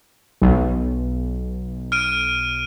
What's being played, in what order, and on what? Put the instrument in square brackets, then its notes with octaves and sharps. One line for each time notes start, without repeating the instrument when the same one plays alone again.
[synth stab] B1
[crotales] F6 D7 D#7